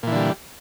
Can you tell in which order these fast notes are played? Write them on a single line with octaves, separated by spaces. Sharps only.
A#2 E3 D3 G3